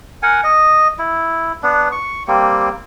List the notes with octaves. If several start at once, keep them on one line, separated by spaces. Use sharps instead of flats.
A#4 F#5 G#5
D#5
E4
B3 D4
C#6
G3 A#3 C4